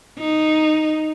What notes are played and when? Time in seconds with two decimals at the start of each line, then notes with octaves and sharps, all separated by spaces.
0.19 D#4